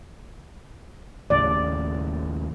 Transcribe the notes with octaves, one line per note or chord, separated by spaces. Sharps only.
D#2 A2 C#3 D5